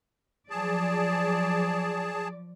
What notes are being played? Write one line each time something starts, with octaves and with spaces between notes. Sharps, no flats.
F3 F#3 G#4 D5 A5